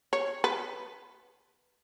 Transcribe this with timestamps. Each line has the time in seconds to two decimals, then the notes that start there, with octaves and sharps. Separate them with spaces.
0.13 C#5
0.44 B4